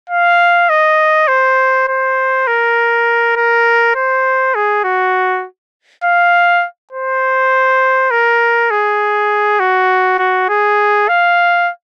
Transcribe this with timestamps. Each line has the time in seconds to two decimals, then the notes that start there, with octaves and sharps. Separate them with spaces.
0.10 F5
0.69 D#5
1.28 C5
1.88 C5
2.47 A#4
3.36 A#4
3.96 C5
4.55 G#4
4.84 F#4
6.04 F5
6.93 C5
8.11 A#4
8.71 G#4
9.60 F#4
10.19 F#4
10.49 G#4
11.09 F5